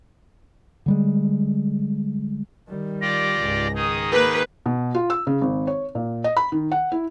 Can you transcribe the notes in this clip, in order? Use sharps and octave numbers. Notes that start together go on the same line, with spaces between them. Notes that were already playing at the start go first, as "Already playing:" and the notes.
D3 G3 G#3
D#3 G3
F4 G4 D5 A#6
C#2 G#2
D#3 D#4 G#4 D#6
A#3 B4 D6
B2
F4
E6
C#3
G#1
C#5
A#2
D#5
B5
D#3
F#5
E4